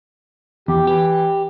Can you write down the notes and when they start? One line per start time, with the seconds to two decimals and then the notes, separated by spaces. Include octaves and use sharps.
0.68 E2 G4
0.87 E3 G4